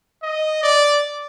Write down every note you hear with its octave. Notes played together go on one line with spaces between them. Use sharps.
D#5
D5